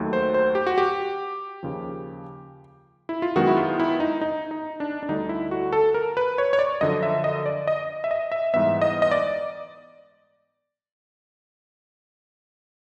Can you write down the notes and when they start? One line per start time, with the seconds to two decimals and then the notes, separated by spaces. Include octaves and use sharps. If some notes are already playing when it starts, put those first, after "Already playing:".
Already playing: D#2 D#3 F#3 A3
0.13 C5
0.34 C5
0.55 G4
0.67 F#4
0.78 G4
1.63 D#2 C#3 F3
3.09 E4
3.22 F4
3.36 F#2 D#3 G#3 B3 F#4
3.47 E4
3.57 F4
3.80 E4
4.00 D#4
4.21 D#4
4.51 D#4
4.80 D4
5.03 D4
5.09 D2 D3 G3 D#4
5.29 E4
5.51 F#4
5.73 A4
5.94 A#4
6.17 B4
6.38 C#5
6.53 C#5
6.59 D5
6.81 F#2 D3 F3 D#5
7.03 E5
7.24 D#5
7.46 D5
7.67 D#5
8.04 E5
8.11 D#5
8.32 E5
8.54 G#2 E3 G3 B3 E5
8.82 D#5
9.02 D#5
9.11 D5